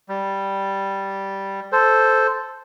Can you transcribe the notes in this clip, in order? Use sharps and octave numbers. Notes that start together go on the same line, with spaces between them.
G3
A4 C5